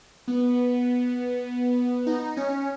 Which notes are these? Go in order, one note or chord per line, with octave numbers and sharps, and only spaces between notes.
B3
D#4
C#4